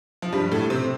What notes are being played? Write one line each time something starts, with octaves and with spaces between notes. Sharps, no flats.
F3
G2 G3
A2 A3
C3 C4